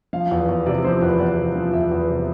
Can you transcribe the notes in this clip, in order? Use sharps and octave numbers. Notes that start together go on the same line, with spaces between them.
F3 F5
E2
E2
C3 D5
F3 C5
E2 B4
E2 D5
C3
F3
E2 E5
E2
C3